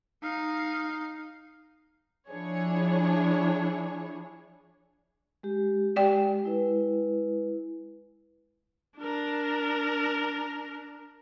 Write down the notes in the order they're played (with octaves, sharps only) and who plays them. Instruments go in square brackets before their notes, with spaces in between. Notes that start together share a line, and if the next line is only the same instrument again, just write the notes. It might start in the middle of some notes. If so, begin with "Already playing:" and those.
[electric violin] D#4 F5
[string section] F3 D4 E4 G#4 C#5
[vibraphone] G#3 G4
[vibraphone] G#3 [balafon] G4 D5 G5
[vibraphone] G#3 E4 B4
[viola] D4 A#4